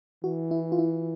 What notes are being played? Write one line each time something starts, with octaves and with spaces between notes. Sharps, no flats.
E3 F#4
E4
F4
E4